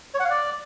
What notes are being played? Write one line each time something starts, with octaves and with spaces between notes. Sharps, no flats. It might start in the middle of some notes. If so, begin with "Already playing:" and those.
C#5
F#5
F5
D5